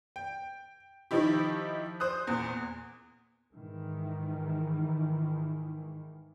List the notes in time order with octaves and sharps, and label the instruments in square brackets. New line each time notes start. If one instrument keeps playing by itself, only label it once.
[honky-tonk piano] G5
D#3 F3 D#4 E4 G4
C5 D#6 F#6
E2 A#2
[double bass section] G#2 D#3 E3